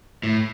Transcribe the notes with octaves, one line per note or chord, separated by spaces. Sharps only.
A2